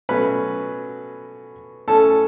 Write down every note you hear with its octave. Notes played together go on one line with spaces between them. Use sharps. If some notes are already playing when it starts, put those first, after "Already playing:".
B2 F#3 A3 C#4 B4 B5
A2 A3 C#4 A4 A5